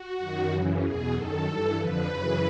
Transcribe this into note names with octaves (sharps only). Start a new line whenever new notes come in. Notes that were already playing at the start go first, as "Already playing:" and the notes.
Already playing: F#4
F#2 D#3
F#2 C#3 E3
E2 B2 G#4
F#2 D#3 A4
G2 E3 A4
F2 D3 F3 B4
F#2 C#3 E3